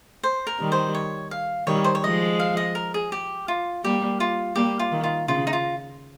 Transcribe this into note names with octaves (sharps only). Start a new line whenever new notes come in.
C5
A#4
D#3 G3
C5
C#5
F5
D#3 G3 C#5
C5
C#5
F3 G#3 D#5
F5
D#5
A#4
G#4
G4
F4
G3 A#3 G4
F4
G3 A#3 G4
F4
D#3
F4
C#3 F4
D#4
F4